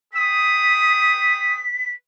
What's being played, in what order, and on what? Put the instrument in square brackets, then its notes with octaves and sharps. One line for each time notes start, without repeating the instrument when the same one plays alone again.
[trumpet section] G#4 G5 D#6 [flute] B6